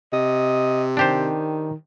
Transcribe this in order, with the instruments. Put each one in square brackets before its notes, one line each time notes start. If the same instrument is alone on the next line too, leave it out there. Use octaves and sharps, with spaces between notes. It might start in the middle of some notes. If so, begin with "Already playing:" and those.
[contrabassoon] C3 [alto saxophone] D#5
[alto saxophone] D#3 [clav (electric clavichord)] D4 G4 C5